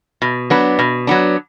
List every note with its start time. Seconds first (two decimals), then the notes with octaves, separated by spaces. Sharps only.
0.22 B2
0.50 F#3 B3 D4
0.79 B2
1.07 F#3 B3 D4